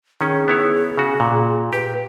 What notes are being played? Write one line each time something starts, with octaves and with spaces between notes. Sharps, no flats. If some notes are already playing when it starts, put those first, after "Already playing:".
D#3 C#4 G#4
B3 E4 C#5
C#3 F#4
A#2
G4 B4